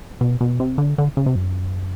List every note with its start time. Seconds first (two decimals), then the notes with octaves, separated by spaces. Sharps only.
0.21 B2
0.41 B2
0.60 C3
0.78 D3
0.98 D3
1.17 C#3
1.26 C3
1.36 F#2